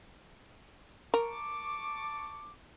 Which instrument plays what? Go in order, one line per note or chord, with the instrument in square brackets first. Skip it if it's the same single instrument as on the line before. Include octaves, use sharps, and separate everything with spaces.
[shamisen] A#4 [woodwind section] A5 C#6 D6